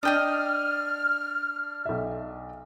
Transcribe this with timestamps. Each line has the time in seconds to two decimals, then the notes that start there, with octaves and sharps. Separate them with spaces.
0.03 D4 D5 D#5 G5 D#6 F6
1.85 B1 E5